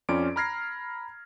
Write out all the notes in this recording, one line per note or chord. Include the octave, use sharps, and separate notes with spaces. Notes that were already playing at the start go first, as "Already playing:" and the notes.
F2 C#4 F4 D5 D6 D7
A#5 B5 F6 G#6 A#6 C7